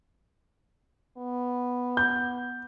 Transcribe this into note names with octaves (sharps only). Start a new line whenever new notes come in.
B3
G6